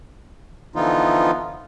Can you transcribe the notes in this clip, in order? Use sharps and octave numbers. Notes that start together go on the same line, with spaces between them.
D3 E3 F3 B3 D#4 F4